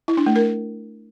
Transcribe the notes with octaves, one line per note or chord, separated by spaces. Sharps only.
E4
D4
A3
A#4